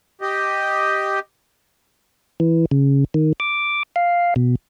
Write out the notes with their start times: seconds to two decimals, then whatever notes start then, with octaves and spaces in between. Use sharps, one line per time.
0.21 G4 D#5
2.40 E3
2.71 C#3
3.14 D#3
3.40 D6
3.96 F5
4.36 B2